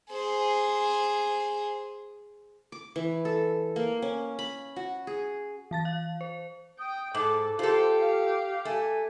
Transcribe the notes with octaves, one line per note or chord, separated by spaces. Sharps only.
G#4 C5
D6
E3
A4
A#3
C#4
B5
F#4
G#4
E3 A5 A6
F5
C5
G5 D#6
G#2 A4 D6
F4 G4 A4 C5
F5
A3 G#5